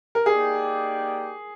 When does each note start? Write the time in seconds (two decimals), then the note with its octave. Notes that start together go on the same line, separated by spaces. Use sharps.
0.15 A#4
0.26 A#3 D#4 G4 G#4 D5 G5